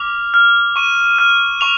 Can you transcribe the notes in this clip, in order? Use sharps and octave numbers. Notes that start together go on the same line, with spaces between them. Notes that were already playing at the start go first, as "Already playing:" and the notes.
Already playing: D6 F6 F7
F6
C#6 D#7
F6
C#6 F7